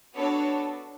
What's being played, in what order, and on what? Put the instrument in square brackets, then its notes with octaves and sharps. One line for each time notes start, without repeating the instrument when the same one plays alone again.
[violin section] B3 D4 F#4 A4 C#5